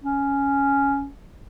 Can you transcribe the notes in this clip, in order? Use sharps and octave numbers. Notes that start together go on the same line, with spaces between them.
C#4